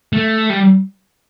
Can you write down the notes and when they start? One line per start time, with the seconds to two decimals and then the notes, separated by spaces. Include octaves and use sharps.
0.13 A3
0.50 G3